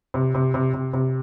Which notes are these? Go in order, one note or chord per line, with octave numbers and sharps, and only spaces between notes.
C3
C3
C3
C3
C3